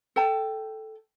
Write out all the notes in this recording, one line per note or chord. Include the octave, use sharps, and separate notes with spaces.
A4 G5 A5